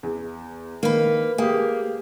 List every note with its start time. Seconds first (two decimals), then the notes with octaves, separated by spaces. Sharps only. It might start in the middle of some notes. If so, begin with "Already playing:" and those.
0.03 E2
0.83 D#3 A#3 B4
1.38 A#3 G4 G#4